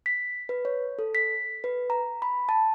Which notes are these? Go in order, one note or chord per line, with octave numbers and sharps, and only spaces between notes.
B6
B4
C#5
A4
B6
B4
A#5
B5
A5